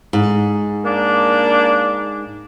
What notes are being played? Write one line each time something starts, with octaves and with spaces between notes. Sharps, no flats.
G#2
A#3 D4